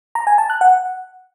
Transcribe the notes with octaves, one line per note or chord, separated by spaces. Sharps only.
A#5
G#5
A5
F#6
F#5